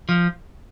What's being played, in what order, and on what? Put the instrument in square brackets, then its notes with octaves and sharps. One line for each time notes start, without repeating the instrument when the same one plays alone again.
[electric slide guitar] F3